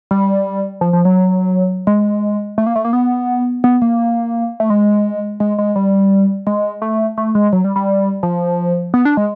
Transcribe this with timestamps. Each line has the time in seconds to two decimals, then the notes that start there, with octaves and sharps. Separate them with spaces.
0.11 G3
0.81 F3
0.93 F3
1.05 F#3
1.87 G#3
2.58 A3
2.66 A#3
2.76 A3
2.85 A#3
2.93 B3
3.64 B3
3.82 A#3
4.60 A3
4.70 G#3
5.40 G#3
5.59 G#3
5.76 G3
6.47 G#3
6.82 A3
7.18 A3
7.35 G#3
7.53 F#3
7.64 G3
7.76 G3
8.23 F3
8.94 B3
9.05 D4
9.17 G#3